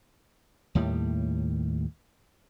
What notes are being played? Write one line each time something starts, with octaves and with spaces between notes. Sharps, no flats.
D#2 A2 G3